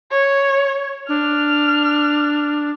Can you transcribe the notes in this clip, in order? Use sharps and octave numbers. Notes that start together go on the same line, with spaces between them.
C#5
D4 F6